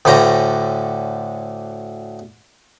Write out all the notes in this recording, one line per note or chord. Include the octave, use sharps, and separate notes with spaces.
D2 A2 D3 C#4 G5 A#5